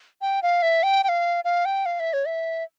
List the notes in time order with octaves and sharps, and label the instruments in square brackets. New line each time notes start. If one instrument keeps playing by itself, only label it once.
[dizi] G5
F5
E5
G5
G5
F5
F5
G5
F5
E5
C#5
E5